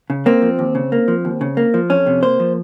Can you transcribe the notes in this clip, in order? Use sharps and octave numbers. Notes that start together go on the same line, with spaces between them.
C#3
A#3 C4
F3
D#2
C#3
A#3
F3
D#2
C#3
A#3
F3
F2 C#4
C3
A#3 C5
F3